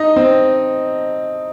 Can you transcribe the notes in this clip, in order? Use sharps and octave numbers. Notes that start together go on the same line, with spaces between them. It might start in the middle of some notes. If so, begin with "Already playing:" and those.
Already playing: D#4 D#5
C4